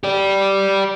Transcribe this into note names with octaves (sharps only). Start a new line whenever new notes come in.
G4 D5